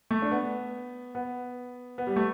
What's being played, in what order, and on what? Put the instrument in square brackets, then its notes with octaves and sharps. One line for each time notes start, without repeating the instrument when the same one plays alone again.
[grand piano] A3
D4
B3
B3
B3
G3
A3